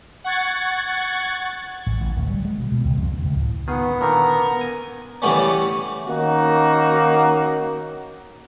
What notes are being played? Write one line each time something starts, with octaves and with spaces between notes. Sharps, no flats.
F#5 C#6 G#6 A6
A1
A1
D1
G3
G#3
B2
B2
C#2
F2
D2
C#2
A2
D#3 B3 F4 G#4
A#2 D3 D#3 A#4
G#5
C#3 E3 G3 A3 B3 C#4
D#3 A#3 C#4 D#4 F#4